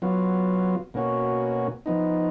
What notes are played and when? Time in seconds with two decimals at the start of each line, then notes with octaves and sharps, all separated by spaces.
0.02 F#3 B3 F4
0.94 B2 A#3 C#4 F#4
1.86 F3 B3 D#4